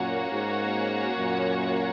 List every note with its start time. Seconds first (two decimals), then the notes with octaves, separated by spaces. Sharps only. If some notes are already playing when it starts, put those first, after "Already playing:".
Already playing: F#2 A#2 A#3 C#4 F#4 C#5 F#5
0.30 G#2
1.17 F#2 A#2